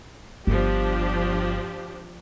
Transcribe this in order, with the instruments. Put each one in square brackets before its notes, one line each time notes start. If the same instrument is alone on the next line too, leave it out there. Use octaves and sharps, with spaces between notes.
[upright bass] G1 [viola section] F3 D4 G4